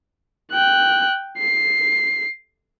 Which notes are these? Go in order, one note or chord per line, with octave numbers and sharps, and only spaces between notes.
G5 F#6
C7